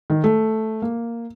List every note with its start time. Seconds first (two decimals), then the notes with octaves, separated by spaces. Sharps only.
0.10 D#3
0.24 A3
0.82 A#3